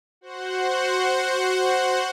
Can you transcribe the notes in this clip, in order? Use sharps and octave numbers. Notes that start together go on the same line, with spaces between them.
F#4 C5 F#5